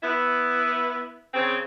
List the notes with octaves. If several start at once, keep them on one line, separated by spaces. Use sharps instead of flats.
B3 E4
C#3 C4